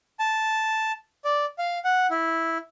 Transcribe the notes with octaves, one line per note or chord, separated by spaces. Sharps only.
A5
D5
F5
F#5
E4